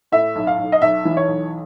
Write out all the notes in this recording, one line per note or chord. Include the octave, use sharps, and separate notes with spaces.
A2 E5
B1
F5
B1
D#5
B1 E5
E3
C#5
B1